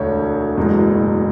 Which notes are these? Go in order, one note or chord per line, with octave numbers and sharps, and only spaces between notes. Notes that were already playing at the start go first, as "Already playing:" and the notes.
Already playing: E1 D2 C#5
F#1 E2 B2 G#3